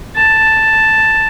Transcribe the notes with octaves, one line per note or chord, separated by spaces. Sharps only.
A5